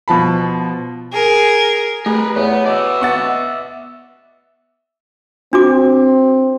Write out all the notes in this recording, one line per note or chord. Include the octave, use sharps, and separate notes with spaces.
B2 F3 A5 B5
G#4 A#4
A3 G4 G#4 A#4 B4
E2 B3 C#5
B2 D5 E5
B3 F#5 C#6 A6
C4 D4 F#4 D6